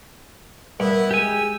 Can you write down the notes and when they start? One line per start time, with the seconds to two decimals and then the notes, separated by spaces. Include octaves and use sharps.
0.80 G2 B3 E4 A#4
1.11 G#3 G4 G#5 E6